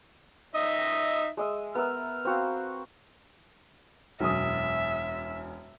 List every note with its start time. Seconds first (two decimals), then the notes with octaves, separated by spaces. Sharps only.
0.55 D#4 D#5 E5
1.37 G#3 D#5 E5
1.75 B3 A#4 E5 F6
2.25 C4 F#4 F5
4.20 E1 F#2 E5 D#6